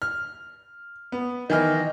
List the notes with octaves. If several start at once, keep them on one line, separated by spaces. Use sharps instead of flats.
F6
B3
D#3 E3 D#5 F6